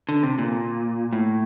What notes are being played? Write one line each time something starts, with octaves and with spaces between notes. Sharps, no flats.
D3
C3
A#2
A2